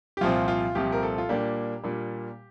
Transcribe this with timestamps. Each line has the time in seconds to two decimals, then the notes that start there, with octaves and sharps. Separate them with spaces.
0.17 G4
0.21 C2 A#2 F3 C4 F4
0.48 F4
0.75 C2 A#2 F3 C4 G4
0.92 A#4
1.03 A4
1.18 F4
1.29 A#2 G3 A#3 D4 G4
1.83 A#2 G3 A#3 D4